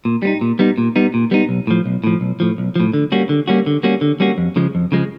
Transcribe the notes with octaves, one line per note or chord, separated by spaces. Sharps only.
A#2
G3 B3 D#4
A#2
G3 B3 D#4
A#2
G3 B3 D#4
A#2
G3 B3 D#4
B1
A2 F3
B1
A2 F3
B1
A2 F3
B1
A2 F3
D3
G3 A#3 C#4 F#4
D3
G3 A#3 C#4 F#4
D3
G3 A#3 C#4 F#4
D3
G3 A#3 C#4 F#4
F2
C#3 F3 G#3
F2
C#3 F3 G#3